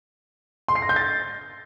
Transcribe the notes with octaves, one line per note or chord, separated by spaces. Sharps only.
C6
C7
A#6
G6
A6